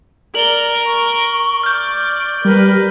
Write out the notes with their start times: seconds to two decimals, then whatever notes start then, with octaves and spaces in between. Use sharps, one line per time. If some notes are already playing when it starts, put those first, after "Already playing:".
0.35 A#4 D5 F#7 G7
0.86 C#6
1.63 D5 F6 G6
2.45 G3 A#4 B4